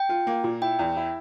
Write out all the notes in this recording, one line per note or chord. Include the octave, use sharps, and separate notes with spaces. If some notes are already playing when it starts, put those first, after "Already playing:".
Already playing: G5
F4
A#3
A#2
E4 G5
E2
E4